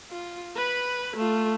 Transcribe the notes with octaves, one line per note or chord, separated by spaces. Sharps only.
F4
B4 B5
A3 F4